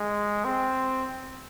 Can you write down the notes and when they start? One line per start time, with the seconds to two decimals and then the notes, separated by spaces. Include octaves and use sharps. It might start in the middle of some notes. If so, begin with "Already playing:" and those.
Already playing: G#3
0.45 C4